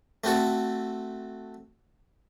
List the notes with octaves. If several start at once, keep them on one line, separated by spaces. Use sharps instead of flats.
A3 C4 F#4 A4